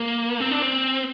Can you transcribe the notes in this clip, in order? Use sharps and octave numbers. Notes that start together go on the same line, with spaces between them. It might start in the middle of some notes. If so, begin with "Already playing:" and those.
Already playing: A#3
C4
D4
C4